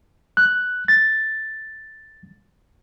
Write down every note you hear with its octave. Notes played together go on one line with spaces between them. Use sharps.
F#6
A6